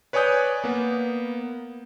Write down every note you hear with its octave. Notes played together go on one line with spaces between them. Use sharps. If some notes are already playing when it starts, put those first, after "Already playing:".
B4 C#5 D5 G#5 D#6 G6
A#3 B3